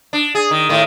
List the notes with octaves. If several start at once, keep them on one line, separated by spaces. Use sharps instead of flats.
D4
G#4
D#3
A2 D#3